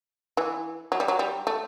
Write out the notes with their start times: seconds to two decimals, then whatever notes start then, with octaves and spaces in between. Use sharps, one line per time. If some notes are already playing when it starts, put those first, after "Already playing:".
0.37 E3
0.92 F#3
1.00 G3
1.08 F#3
1.19 G3
1.47 A3